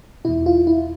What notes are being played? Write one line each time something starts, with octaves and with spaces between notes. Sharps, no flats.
E2 B2 E4
F4
E4